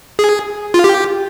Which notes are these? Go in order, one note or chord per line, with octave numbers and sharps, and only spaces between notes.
G#4
F4
G4